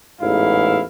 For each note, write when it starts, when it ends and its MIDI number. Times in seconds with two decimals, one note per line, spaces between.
0.20 0.82 33
0.20 0.82 40
0.20 0.82 44
0.20 0.82 64
0.20 0.82 77